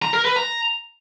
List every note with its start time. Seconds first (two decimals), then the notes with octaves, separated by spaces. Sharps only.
0.02 A#5
0.14 A#4
0.25 B4
0.36 A#5